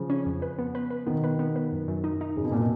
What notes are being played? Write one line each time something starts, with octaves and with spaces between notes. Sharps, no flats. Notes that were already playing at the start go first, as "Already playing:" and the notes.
Already playing: C#3 F3
C#4
F2
B4
B3
B4
B4
B2 D#3 B3
B4
B3
B4
F#2
F#2
D#4
D#4
F#2 C#3
B2
A#2 A#3
B2